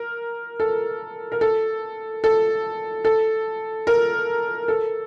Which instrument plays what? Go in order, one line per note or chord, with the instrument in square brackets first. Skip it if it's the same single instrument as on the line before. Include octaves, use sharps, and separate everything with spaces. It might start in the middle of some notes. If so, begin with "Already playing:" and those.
Already playing: [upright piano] A#4
A4
A#4
A4
A4
A4
A#4
A4